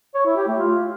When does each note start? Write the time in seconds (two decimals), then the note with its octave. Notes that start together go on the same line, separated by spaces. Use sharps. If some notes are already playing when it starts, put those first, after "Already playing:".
0.15 C#5
0.26 E4
0.37 G4
0.48 A3
0.59 F4